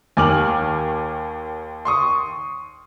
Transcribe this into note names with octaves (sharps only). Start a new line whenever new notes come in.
D#2 D#3 G#5 D6 F6 F#7
C6 C#6 D#6